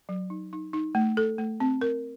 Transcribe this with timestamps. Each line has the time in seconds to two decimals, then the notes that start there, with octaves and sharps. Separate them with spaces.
0.09 F#3
0.30 D#4
0.53 D#4
0.73 D#4
0.95 A3
1.17 A4
1.38 A3
1.60 C4
1.81 A#4